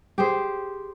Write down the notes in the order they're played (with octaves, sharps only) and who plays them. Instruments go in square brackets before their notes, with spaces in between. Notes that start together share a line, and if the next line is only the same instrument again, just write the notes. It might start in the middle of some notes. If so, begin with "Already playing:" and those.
[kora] G4 G#4 C5